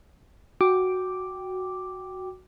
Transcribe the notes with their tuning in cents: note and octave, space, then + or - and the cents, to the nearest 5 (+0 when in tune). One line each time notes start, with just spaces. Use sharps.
F#4 +0 G5 +0 D6 +0